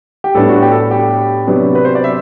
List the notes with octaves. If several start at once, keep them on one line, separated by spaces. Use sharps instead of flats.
G4
A2 G3 B3 D4 A4
F#4
G4
A4
G4
C3 F#3 B3 D4
B4
C5
D5
E5